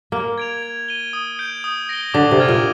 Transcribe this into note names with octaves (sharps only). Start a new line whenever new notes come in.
A#3 F6
G#6 D7 F7
G#6
D#7 G7
D#6
G6 D7
D#6
A#6 D7 G7
D3 D6
C3
F6 G#6 D#7
A#2